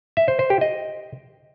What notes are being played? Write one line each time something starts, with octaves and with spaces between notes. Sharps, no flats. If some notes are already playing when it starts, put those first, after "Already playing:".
E5
C5
C5
G4
D#5